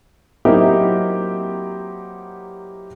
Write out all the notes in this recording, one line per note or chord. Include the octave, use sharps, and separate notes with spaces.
F#3 A#3 C4 D#4 E4 G4